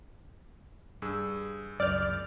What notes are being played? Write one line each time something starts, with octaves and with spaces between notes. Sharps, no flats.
G2 G#4 E6
C#2 F#2 D5 F6 G6